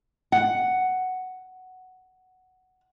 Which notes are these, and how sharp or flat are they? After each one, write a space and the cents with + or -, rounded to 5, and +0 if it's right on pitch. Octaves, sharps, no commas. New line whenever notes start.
F#5 +5